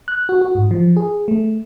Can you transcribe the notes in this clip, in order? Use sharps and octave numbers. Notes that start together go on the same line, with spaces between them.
F#6
F#4
F#4
G#2
F3
G#4
A3